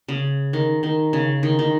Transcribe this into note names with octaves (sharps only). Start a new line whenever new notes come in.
C#3
D#3
D#3
C#3
D#3
D#3